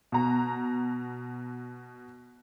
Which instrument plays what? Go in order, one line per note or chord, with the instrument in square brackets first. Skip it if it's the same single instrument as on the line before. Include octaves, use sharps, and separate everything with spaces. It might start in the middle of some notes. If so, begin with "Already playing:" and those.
[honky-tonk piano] B2 A#5